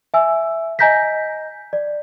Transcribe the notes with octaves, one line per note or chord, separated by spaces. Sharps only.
E5 G#5 E6
D#5 G#5 A#5 G6 A#6 B6
D5